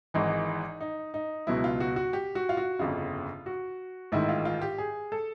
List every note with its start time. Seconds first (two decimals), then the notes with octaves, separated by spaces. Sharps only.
0.14 G#1 G#2 E3 D#4
0.81 D#4
1.14 D#4
1.47 C#2 B2 F#3 B3 E4
1.64 F4
1.80 F#4
1.96 F#4
2.13 G4
2.35 F#4
2.49 F4
2.57 F#4
2.79 G1 F2 C#3 F4
3.46 F#4
4.12 A1 G#2 D#3 E4
4.29 F4
4.45 F4
4.62 G4
4.78 G#4
5.12 A4